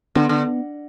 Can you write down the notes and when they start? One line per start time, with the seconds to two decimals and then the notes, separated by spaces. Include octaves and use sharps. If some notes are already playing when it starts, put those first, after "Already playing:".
0.15 D3 B3
0.29 D3